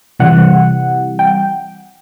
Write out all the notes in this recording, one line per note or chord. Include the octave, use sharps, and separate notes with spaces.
C3 E3 G3 F#5
G5